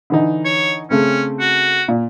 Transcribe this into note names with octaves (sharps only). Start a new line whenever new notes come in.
D3 E3 D#4
C#5
C#3 A3 C4 C#4
F#4
A#2